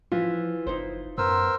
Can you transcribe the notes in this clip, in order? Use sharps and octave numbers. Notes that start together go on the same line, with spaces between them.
E3 F3 F4
F#1 D#4 E4 C5
F#2 B3 A#4 C5 E6